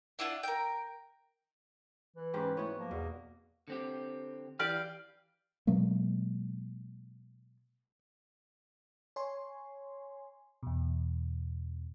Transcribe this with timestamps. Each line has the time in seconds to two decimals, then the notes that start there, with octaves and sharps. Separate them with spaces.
0.19 D4 E4 F4 F#5
0.43 A#4 G5
2.16 E3
2.34 G#2 C#4 G4 B4
2.57 A3 B3 E4 F#4 C#5
2.79 F3 A#3
2.91 E2 B2
3.68 D3 C4 G4
4.59 E3 G4 B4 D5 F5
5.67 B2 F#3 G#3 A#3
9.16 C#5 G#5 C6
10.63 E2 B2